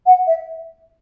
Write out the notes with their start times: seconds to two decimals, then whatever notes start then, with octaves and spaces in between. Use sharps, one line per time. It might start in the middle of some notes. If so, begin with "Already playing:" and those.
0.06 F#5
0.27 E5